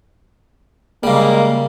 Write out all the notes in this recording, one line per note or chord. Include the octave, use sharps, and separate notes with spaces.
C#3 G3 G#3 A#3